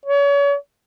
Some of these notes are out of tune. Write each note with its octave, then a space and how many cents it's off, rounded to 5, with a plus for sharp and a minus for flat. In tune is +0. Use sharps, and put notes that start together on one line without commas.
C#5 +35